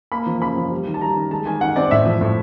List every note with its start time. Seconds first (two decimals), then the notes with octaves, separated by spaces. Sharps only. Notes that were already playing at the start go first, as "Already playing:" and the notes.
0.12 A#3 B5
0.26 F3
0.41 C#3 B5
0.57 F3
0.71 G3
0.87 D#3
0.94 A5
1.01 G3 A#5
1.16 D#3
1.31 G#3 A5
1.46 D#3 G#5
1.61 D#3 F#5
1.76 C4 D5
1.91 A2 E5
2.06 F3
2.21 A2